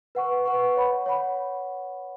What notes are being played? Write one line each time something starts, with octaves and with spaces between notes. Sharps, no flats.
B4 F#5 C#6
B4 F#5 C#6
C#5 F#5 B5
C#5 F#5 B5